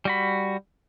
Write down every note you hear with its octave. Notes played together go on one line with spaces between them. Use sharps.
G3 F#4 B5